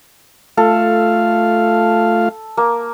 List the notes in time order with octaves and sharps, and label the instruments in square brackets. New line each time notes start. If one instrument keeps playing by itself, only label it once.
[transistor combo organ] A3 F4 F5 [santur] A4
[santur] A#3